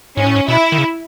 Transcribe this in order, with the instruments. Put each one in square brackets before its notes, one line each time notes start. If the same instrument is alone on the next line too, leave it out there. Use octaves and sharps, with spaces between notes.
[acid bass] G#2 [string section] C#4
[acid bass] A2
G#2
[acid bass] B2 [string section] E4
[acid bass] D#3
C#3